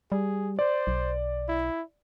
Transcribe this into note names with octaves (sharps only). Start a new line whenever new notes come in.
G3 G#4
C5 D5
B1
E4